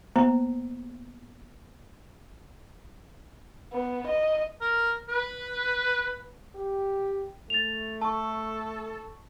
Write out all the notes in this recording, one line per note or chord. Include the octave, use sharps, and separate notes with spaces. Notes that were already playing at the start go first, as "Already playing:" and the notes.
A#3 B3 C5 A#5
B3
D#5
A#4
B4
G4
A3 A6 F7
A4 A5 C#6